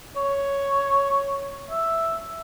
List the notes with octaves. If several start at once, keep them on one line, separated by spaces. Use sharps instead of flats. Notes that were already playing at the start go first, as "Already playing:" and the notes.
C#5
E5